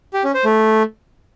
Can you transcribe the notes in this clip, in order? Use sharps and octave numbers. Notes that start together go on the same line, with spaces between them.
G4
C#4
C5
A3